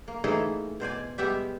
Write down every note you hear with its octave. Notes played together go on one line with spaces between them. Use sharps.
A#3
E3 A3 A#3 D#4 G#4 A4
B2 C5 D5 G#5
G3 G#3 B3 G4 E5